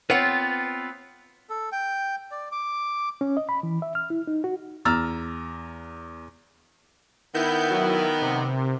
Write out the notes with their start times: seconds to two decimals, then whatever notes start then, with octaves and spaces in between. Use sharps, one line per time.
0.10 B3 C4 F4 B4 C#5 F#5
1.50 A4
1.72 G5
2.31 D5
2.52 D6
3.21 C#4
3.37 D#5
3.49 B5
3.63 E3
3.82 E5
3.95 F6
4.10 E4
4.27 D#4
4.44 F#4
4.85 E2 A#5 E6 F6 A6
7.35 D#3 B3 E4 G6
7.71 F#3 E4
8.22 C3